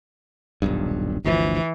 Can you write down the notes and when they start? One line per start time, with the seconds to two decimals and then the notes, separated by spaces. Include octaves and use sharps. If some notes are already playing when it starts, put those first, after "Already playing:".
0.62 D#1 B1 G2
1.24 G1 D2 E3 F3